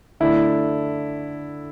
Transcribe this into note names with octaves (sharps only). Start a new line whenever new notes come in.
D3 A3 D4 E4